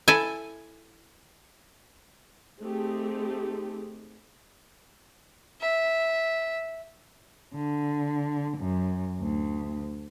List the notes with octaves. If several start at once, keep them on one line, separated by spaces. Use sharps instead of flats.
E4 A4 G#5
A3 C4 D#4 G4 G#4
E5
D3
F#2
D2